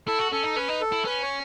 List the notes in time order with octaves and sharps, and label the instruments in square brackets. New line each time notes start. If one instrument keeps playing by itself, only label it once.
[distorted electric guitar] E4 [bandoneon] A4
[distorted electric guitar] F#4
[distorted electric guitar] C#4 [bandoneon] A4
[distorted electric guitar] D#4
[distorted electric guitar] C#4 [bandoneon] B4
[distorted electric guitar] D#4
[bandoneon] A4
[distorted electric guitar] E4
[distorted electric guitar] C#4 [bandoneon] B4
[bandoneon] C#5